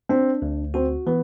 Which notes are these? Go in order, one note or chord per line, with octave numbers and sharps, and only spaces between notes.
C4 D4
D2
C4 F#4
E3 B3